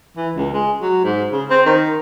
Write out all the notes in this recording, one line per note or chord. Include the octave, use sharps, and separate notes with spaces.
E3
C#2
G#3
F#3
G#2
C#3
C4
D#3